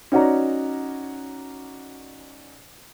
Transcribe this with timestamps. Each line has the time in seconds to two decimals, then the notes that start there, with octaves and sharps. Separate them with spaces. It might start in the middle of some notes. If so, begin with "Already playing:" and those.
0.12 C#4 D#4 F#4 D5 A#5